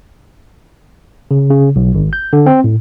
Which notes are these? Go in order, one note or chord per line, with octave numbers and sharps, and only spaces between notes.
C#3
C#3
B1
G#1
G6
D3
C4
A2